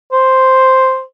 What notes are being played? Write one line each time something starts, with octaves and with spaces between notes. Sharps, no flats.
C5